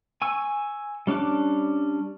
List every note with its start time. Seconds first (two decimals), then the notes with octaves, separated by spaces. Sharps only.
0.22 G#5 C#6 E6
1.07 G3 C#4 D4 D6 F#6